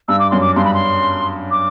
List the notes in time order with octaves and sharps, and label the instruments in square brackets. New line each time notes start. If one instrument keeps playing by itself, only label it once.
[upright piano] G2 [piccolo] E6
[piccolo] D6
[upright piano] F#2 [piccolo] C6
[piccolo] D6
[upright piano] G2 [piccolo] C6
[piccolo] B5
C6
D6